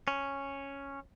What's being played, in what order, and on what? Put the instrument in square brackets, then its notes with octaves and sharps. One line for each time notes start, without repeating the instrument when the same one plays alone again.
[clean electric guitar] C#4